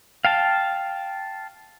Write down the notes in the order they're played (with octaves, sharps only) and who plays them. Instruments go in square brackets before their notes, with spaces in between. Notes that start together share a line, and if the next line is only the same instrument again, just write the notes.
[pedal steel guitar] F5 G5 A5